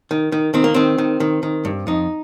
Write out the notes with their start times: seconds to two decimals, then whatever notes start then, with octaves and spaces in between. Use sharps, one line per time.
0.11 D#3
0.32 D#3
0.54 D#3 C4
0.64 A#3
0.74 D#3 C4
0.98 D#3
1.20 D#3
1.43 D#3
1.65 G2
1.87 F2 D#4